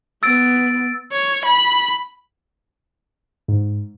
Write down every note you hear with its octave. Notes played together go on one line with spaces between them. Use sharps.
B3 E6 A6 D7
C#5
B5
G#2